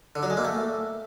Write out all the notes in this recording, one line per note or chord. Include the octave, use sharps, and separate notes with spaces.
D3
F#3
G#3
A#3
A3